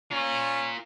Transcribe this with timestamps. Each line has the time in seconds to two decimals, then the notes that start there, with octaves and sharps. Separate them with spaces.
0.11 C#4 F4 A#4